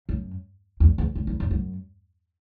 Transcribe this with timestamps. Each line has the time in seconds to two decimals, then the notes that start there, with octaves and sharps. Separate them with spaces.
0.09 F#2
0.80 E2
0.98 E2
1.15 F#2
1.27 E2
1.40 F#2
1.51 F#2